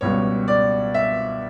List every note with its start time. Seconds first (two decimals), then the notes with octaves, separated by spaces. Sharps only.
0.01 C#2 B2 G3 C#5
0.48 D5
0.94 E5